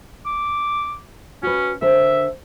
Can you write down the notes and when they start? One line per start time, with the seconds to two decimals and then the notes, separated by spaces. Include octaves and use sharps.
0.26 D6
1.43 C#4 F#4 B4
1.82 D3 A#4 C5 E5